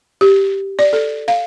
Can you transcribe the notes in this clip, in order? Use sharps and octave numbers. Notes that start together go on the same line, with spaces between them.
G4
D5
A4
F5